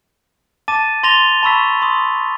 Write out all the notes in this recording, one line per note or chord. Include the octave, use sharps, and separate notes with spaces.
A5 D6 A6 D#7
C6 A6 A#6 F7 G7
A5 B5 C#6 E6 B6
C6 D#6